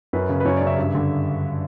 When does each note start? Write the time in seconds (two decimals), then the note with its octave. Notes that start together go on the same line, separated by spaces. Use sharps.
0.13 F#2 B4
0.29 C#3
0.40 B4
0.45 F#2 C#5
0.57 C#3 D5
0.67 E5
0.77 G2
0.95 D3